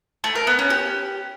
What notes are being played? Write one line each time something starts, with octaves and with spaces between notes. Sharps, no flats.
A3
A#4
B3
C#4
G4